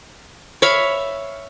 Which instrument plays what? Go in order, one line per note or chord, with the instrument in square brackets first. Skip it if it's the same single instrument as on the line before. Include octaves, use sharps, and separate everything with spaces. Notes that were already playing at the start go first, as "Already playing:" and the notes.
[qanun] C#5 E5 F5 B5